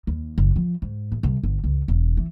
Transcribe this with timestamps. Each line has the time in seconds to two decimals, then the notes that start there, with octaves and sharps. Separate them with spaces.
0.07 D#2
0.38 F#1
0.56 F3
0.82 G#2
1.12 A1
1.23 C2
1.43 G1
1.64 C#2
1.88 E1
2.17 E3